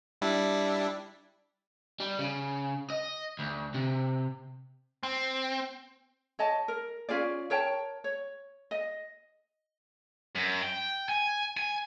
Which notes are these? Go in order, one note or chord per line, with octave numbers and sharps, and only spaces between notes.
G3 D4 E4
G3
C#3
D#5
D2
C3
C4
C#5 D#5 A5
A#4
C#4 F4 G#4 D5
A#4 C#5 G5 A5
C#5
D#5
F#2
G5
G#5
G#5